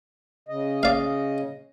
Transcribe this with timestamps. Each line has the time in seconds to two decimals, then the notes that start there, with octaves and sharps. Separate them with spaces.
0.49 C#3 D#5
0.83 D5 F5